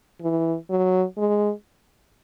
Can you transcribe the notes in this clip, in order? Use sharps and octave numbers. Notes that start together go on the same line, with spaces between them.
E3
F#3
G#3